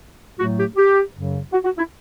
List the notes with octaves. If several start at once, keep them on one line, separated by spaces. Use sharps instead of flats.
A2 F#3 A3 F#4
G4
G4
F#2 C#3 F#3
F#4
F#4
E4